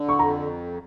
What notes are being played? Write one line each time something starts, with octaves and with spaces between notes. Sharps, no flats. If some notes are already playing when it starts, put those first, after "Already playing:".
Already playing: D3
C#6
F2 A#5